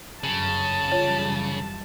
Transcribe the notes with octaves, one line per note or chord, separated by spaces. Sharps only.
G1 F#2 C#3 A5
F#2 E3 G3 F4 C#5